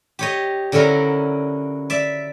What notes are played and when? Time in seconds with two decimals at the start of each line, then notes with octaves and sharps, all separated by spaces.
0.19 G4 C#5 D#5
0.72 D3 F#3 C#4 E4 A#4
1.90 D5 E5